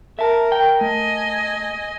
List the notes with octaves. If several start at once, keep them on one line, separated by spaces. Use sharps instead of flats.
A#4 E5 A5
G5
A3 D#5 G#5